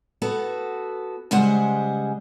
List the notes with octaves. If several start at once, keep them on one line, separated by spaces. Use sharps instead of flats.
B3 F#4 A4
C#3 G3 G#3 G#4 C5 F#5